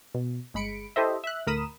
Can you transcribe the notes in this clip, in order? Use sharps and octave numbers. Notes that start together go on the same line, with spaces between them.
B2
G1 G#3 B5 C#7 D7
E4 G4 A4 C5 D#5 E5
E5 F#6
D2 A2 A#4 B5 D#6 E7